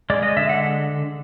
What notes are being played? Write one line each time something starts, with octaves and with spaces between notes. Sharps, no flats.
G#3 D5
D#5
D3 E5
F#5